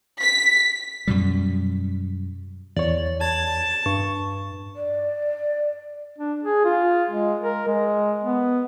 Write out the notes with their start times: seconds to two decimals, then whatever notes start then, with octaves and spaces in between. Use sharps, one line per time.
0.21 B6
1.07 F#2 B2 G3
2.77 E2 C#5 D5
3.21 A5 G#6
3.86 G2 C#6
4.76 D5
6.18 D4
6.43 G#4
6.64 F4
7.11 G#3
7.40 A#4
7.67 G#3
8.24 B3